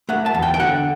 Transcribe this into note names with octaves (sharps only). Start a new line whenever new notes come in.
A3 F#5
A5
E2
G5
G5
D3 F#5